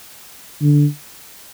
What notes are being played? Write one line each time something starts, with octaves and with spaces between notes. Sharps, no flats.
D3